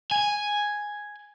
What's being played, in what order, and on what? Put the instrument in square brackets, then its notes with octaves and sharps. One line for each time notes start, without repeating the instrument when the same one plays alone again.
[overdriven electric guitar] G#5